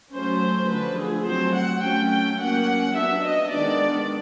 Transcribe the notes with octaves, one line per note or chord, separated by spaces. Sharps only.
F#3 A3 C#4 C5
D3 F3 A3 B4
G#4
F#3 A3 C4 C5
F#5
F#3 A3 C#4 G5
G5
F#3 A#3 C#4 F#5
F#3 B3 D4 E5
D#5
D#3 G#3 B3 D4 D5